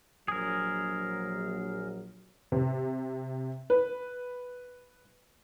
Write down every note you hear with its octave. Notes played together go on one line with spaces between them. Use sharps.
A#1 F#3 G#4 A#4
C3
B4